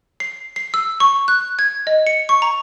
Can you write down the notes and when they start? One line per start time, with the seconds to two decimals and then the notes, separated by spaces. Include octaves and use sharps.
0.20 C7
0.56 C7
0.74 E6
1.00 C#6
1.28 F#6
1.59 G#6
1.87 D#5
2.07 C#7
2.29 C#6
2.42 A#5